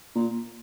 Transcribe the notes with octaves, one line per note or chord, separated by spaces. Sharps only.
A#2